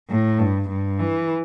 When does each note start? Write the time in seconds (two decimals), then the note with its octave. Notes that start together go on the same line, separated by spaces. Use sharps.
0.10 A2
0.39 G2
0.69 G2
0.99 E3